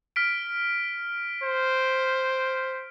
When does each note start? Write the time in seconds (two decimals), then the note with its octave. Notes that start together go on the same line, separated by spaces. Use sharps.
0.16 F6 B6 D7
1.44 C5